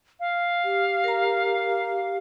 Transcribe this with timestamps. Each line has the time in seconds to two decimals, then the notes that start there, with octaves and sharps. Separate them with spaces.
0.20 F5
0.64 G4
1.04 A#4 A#5